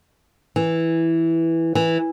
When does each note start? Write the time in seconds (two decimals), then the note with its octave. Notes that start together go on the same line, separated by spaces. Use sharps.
0.56 E3
1.75 E3